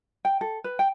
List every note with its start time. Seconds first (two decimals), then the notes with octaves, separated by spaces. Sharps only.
0.25 G5
0.41 A4
0.64 B4
0.79 G5